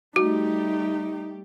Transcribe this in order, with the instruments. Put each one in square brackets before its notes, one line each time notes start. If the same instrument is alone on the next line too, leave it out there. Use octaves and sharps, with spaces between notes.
[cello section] G3 A3 G4 [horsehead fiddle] D#4 [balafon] F#4